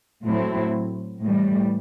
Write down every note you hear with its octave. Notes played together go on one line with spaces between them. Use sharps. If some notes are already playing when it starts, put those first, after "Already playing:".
A2 F#3 A3 C4 E4
A2 E3 G3